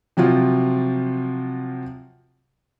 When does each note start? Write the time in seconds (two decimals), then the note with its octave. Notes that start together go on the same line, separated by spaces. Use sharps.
0.17 C3 F3 F#3 F4